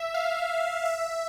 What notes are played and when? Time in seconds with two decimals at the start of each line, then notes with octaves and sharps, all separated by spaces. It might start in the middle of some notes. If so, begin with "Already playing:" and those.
Already playing: E5
0.14 F5
0.85 E5